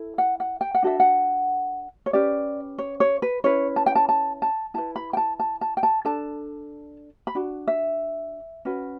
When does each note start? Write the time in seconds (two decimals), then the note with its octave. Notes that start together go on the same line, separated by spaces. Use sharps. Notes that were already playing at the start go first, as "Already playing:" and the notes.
Already playing: E4 A4
0.18 F#5
0.40 F#5
0.61 G5
0.75 F#5
0.83 D4 F#4 A4 E5
1.00 F#5
2.06 C#5
2.13 C#4 G4 B4 D5
2.78 C#5
3.00 C#5
3.22 B4
3.44 C#4 E4 B4 C#5
3.76 A5
3.86 G5
3.95 A5
4.09 A5
4.42 A5
4.74 E4 B4 A5
4.96 B5
5.13 G5
5.17 A5
5.40 A5
5.61 A5
5.77 G5
5.83 A5
6.05 D4 A4 A5
7.27 B5
7.35 D4 F#4
7.68 E5
8.65 C#4 F#4 B4